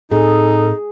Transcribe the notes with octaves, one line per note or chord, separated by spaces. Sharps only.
A2 C4 D#4 G#4 A4